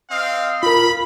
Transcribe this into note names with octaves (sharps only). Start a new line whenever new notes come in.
C4 D#5 F5
F4 A#4 B5